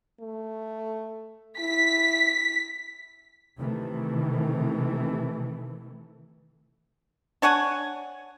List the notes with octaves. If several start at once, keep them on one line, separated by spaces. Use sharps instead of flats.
A3
E4 B6
C3 D#3 E3 A3
D4 C#5 F#5 G#5